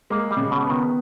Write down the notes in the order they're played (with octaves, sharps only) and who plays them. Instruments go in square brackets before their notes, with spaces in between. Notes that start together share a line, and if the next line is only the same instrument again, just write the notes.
[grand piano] G#3 [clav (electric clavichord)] A#3
[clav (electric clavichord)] G3
[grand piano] C#3
[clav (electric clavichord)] B2
[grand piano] B3
[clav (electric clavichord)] D#3